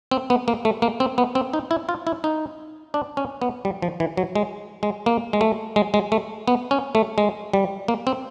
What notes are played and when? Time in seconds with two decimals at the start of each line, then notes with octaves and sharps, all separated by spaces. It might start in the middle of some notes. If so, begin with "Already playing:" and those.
0.11 C4
0.30 B3
0.48 A#3
0.65 A3
0.82 A#3
1.00 C4
1.18 B3
1.35 C4
1.53 D#4
1.71 E4
1.89 F4
2.07 E4
2.24 D#4
2.94 D4
3.17 C#4
3.42 B3
3.65 G3
3.82 F3
4.00 E3
4.17 F#3
4.35 G#3
4.83 G#3
5.06 A#3
5.33 G#3
5.41 A3
5.76 G#3
5.94 G#3
6.12 A3
6.48 B3
6.71 C#4
6.95 A3
7.18 G#3
7.53 G3
7.88 A#3
8.07 C4